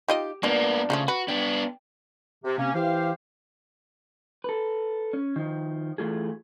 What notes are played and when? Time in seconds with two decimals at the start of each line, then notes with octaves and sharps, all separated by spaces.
0.08 D#4 F4 G4 D#5
0.43 A#2 F3 A#3 B3 D4 D5
0.90 C#3 F3 A3 D#4
1.08 F#4 B4
1.28 B3 D4 G5
2.44 C3
2.57 C3 A#3 C#4
2.74 E3 G4 C5 F5
4.44 A4 B4
5.13 C#4
5.36 D#3 F3
5.98 E3 A3 F4 G#4